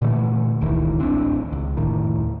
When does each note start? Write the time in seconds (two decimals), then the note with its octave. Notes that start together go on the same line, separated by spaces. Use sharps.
0.02 A#2 D3 E3 A3
0.61 E1 C#2 D#3 E3
0.99 D1 A1 C4 D4
1.52 C#2
1.77 F1 D2 A2 D#3